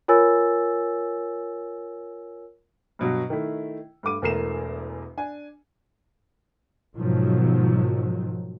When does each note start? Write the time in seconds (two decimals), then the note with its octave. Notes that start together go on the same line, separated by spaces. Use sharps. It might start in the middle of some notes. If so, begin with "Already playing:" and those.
0.08 F4 A#4 C#5 G#5 E6 A6
2.99 G2 B2 F#3
3.30 D#3 A3 E4
4.03 G2 A3 D6 D#7
4.22 E1 E2 A3 A#4 C7 E7
5.17 D4 G#5
6.96 G#2 B2 D#3 F3 F#3